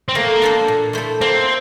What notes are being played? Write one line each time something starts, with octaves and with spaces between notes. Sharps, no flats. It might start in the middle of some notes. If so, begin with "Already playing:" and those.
C4
A3 A#3
D4 A4 C5
A#2
A3 E4 A4 C5
A#3 C4